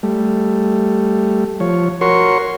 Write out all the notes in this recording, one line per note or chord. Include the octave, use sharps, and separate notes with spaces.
G3 A3
F3 C#5
F#4 A#4 C#5 C6 C#6